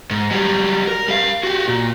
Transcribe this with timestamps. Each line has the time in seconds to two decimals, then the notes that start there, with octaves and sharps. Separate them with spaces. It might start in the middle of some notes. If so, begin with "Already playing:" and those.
0.11 G#2
0.31 F#3 G3
0.87 A#4
1.08 G3 F5
1.43 F#4 G4
1.68 A#2